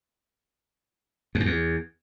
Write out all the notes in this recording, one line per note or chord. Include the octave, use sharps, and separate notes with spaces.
F2
F#2
E2